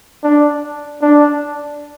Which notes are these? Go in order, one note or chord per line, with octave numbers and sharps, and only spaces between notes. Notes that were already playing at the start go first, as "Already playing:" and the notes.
D4
D4